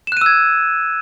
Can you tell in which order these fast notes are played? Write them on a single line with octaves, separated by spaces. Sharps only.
E7 F#6 D#7 E6 G#6